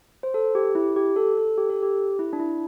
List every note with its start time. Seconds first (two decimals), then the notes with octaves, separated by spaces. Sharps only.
0.23 C5
0.34 A4
0.55 G4
0.75 E4
0.96 G4
1.16 A4
1.38 A4
1.57 G4
1.70 A4
1.83 G4
2.19 E4
2.33 D4
2.40 E4